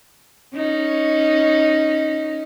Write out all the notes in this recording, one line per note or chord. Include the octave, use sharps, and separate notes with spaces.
C#4 D#4